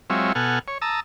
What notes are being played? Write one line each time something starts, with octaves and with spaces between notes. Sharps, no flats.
F#3 G#3 C4 F4 C#5 E5
B2 A4 F#5 G#5 F6
C#5
A5 A#5 D#6 E6